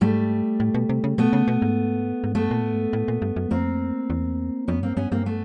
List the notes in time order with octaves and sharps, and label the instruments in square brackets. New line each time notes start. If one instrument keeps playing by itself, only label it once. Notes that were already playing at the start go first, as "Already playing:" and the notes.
[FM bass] G#2 [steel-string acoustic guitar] G3 A3
[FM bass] A2
B2
C3
C#3
[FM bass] B2 [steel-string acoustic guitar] A3 B3
[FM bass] C#3
B2
G#2
G#2
[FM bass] G2 [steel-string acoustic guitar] A3 B3
[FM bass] A#2
A2
G#2
A2
A#2
G2
F#2
[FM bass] F2 [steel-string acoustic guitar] A#3 C4
[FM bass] E2
[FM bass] F2 [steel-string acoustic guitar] B3 C#4
[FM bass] F#2
[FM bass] G2 [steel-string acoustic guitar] A#3 C4
[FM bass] G2 [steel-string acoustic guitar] B3 C#4
[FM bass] G2 [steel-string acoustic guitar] A#3 C4
[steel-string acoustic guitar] A3 B3